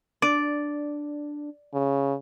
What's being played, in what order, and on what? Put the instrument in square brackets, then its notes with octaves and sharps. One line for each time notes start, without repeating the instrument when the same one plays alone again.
[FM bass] D4 [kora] D5
[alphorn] C#3